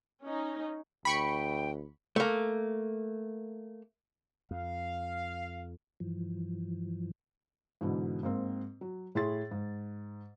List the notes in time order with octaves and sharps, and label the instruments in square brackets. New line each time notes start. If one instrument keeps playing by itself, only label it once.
[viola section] C#4 D#4
[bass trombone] D2 [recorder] G5 [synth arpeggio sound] B5 C#6 C#7
[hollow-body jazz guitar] A3 A#3
[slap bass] F2 [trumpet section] F5
[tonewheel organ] G2 E3 F3
[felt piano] G#2 B2 D3 E3
G#2 A#3 C4
F#3
A2 E4 G#4 C6 A6
G#2